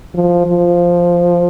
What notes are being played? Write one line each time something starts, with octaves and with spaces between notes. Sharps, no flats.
F3
F3